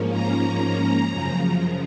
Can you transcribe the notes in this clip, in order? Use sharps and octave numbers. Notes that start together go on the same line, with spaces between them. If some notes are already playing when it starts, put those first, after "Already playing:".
Already playing: G#2 F3 A#3 C#4
A#5
F#2 C#3 F3